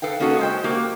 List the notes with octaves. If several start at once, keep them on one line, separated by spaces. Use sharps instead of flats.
A4 B4 F5 G5
A#3 C#4 D#4 F#4 A4 F#5
G#3 C5 G5
A#3 F#4 G4